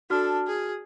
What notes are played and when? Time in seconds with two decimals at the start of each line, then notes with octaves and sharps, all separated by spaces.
0.10 D4 F#4 A4 F6
0.47 G#4